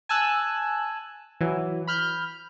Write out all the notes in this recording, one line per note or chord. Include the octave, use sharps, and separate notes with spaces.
G#5 A5 E6 F#6
E3 F#3
B5 F6 G6